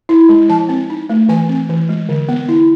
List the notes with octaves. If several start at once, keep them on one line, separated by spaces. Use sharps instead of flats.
E4
G#3
F3 A5
C4
D#4
A3
E3 G#5
C4
E3
G#3
D3
B3
E4